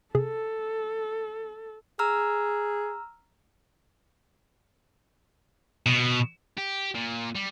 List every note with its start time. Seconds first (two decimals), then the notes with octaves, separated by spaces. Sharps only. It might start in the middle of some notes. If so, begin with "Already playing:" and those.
0.15 C3 G#4 A4
1.99 G#4 A#5 E6 F6
5.86 B2
6.57 G4
6.95 A#2
7.35 G3